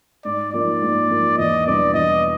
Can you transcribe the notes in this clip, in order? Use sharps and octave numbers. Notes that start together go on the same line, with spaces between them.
G#2 D5
F3 A#3 D#4 D5
G#2
F3 A#3 D#4
E2 D#5
B2 G3 B3 D4 D5
E2 D#5